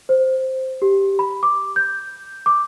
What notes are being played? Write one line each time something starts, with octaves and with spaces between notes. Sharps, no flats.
C5
G4
B5
D6
G6
D6